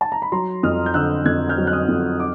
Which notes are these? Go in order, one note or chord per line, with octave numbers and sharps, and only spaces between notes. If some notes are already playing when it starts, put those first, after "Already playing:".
A5
A#5
B5
F#3 A#5 C6
F2 D#6 F6
G6
D3 E6 F#6
F2 F#6 G#6
F6 G6
F#3
F#6
D#6 F6
F2
D6